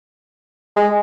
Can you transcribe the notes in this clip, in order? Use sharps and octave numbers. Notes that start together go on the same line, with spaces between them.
G#3